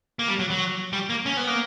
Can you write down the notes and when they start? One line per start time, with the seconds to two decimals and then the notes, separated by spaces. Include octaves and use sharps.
0.19 A#3
0.28 G3
0.39 F#3
0.50 F#3
0.93 G3
1.10 A#3
1.26 C#4
1.37 B3
1.47 A#3